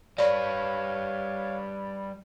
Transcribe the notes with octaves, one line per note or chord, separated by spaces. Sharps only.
G3 B4 C#5 D5 F5